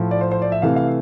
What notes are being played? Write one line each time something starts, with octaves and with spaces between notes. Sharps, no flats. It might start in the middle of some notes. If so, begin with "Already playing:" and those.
Already playing: A2 F3 A3
D5
C5
C5
D5
E5
C3 E3 A3 F5
F5